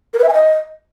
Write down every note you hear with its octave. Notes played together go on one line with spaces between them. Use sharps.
A#4
B4
E5
G#5
D#5